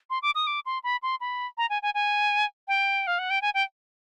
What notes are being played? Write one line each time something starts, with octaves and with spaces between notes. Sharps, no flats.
C6
D6
D#6
D6
C6
B5
C6
B5
A#5
G#5
G#5
G#5
G5
F5
F#5
G5
G#5
G5